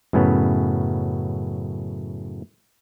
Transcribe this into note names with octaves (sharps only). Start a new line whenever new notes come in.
F#2 A2 C#3 B3